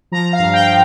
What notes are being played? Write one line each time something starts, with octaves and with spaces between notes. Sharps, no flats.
F3 A#5
F5
G2
G5
F3